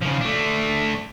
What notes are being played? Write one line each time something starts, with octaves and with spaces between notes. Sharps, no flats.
C#3 F3
A3 D4